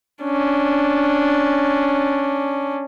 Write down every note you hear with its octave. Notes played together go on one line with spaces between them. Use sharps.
C#4 D4